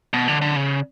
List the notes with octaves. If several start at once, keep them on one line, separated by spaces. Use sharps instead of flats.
B2
D3
D3
C#3